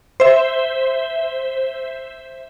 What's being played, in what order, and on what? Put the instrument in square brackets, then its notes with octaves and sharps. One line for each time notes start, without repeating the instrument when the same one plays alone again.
[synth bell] C5 E5